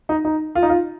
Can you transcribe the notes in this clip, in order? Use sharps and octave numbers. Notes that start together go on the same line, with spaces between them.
D#4
D#4
F4
D#4
F4